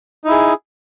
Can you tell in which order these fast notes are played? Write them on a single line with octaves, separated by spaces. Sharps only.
D#4 E4 G#4